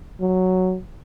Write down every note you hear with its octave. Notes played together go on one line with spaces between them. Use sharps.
F#3